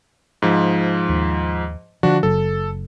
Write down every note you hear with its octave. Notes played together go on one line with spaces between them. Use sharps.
G#2 F3
D#2
D3 F3 D4 F#4
F#1 C#3 F#3 A4